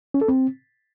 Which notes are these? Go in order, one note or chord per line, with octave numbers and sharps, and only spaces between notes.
C#4
A4
C4